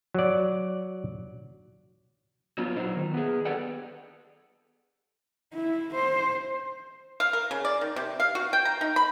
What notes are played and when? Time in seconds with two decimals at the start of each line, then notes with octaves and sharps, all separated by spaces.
0.15 F#3 D5
2.58 F#3 B3 F4
2.76 A#2 F#3 D#4 E4 C5
2.97 D#3
3.14 B3 G#4
3.45 G4 A4 B4 D5 F#5 G5
5.54 E4
5.95 C5
7.20 F5
7.33 A#4
7.51 C#3
7.65 D5
7.81 D#3
7.96 C3
8.20 F5
8.35 F#4
8.53 G5
8.65 A#5
8.81 D#4
8.96 B5